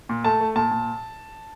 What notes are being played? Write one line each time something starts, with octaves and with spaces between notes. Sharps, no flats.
A#2
A3 A5
A3
A#2 A5
A#2